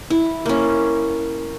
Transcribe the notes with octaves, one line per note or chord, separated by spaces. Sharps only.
E4
A#3 C#4